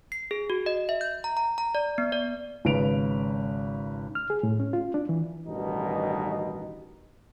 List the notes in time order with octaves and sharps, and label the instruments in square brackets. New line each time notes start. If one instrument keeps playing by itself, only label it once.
[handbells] C7
G#4
F#4
D#5
E5
G6
A#5
A#5
A#5
D5
B3
D5
[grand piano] G#1 C#3 B4 D7 F7
[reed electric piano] F6
G#4
A2
C#4
F4
D4
E3
[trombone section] A1 G2 B2 D#3 D#4